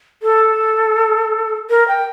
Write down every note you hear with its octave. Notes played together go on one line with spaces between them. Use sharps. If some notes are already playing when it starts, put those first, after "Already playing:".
A4
A#4
G5